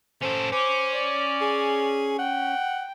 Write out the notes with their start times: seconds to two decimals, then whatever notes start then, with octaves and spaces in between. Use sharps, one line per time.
0.22 C#4 A4 C5
0.52 C#4 C5 D6
0.94 D5
1.41 G#4
2.19 F#5 G5